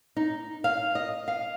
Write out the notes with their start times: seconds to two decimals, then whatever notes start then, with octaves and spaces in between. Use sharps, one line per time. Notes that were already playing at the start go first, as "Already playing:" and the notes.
0.16 D#4
0.64 F5
0.95 D#5
1.28 F5